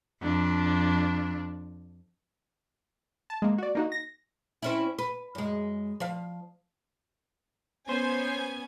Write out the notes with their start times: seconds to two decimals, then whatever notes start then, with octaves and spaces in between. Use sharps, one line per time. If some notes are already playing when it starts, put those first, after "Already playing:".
0.22 F2 D4
3.30 A5
3.42 G#3 A#3
3.58 F#4 D5
3.75 A#3 D#4 F#4
3.92 A#6
4.62 C4 C#4 E4
4.99 B4
5.35 F#2 G#3
6.00 F3 F5
7.89 B3 C#4 C5 G#5